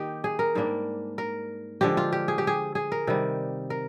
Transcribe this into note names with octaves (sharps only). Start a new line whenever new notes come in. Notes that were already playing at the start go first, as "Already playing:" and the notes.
Already playing: D#3 A#3 D#4 G4
G#4
A#4
G#2 G3 A#3 D4
A#4
D3 F3 G#3 G4
F4
G4
G#4
G4
G#4
G#4
A#4
C3 D#3 G3
A#4